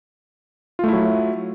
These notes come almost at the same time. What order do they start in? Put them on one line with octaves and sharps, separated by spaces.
F4 A3 E4 F#3